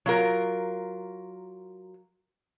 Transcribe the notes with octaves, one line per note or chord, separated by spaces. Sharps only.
F#3 F4 A#4